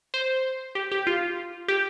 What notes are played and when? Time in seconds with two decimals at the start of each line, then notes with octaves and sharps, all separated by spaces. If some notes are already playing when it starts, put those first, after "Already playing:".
0.14 C5
0.75 G4
0.92 G4
1.07 F4
1.68 G4